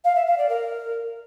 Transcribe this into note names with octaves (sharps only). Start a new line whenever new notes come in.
F5
E5
F5
D5
A#4